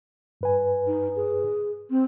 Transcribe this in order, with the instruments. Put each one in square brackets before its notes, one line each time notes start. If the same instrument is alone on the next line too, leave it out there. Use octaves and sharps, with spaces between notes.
[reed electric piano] G2 B4 G#5
[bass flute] D#4
G#4
C4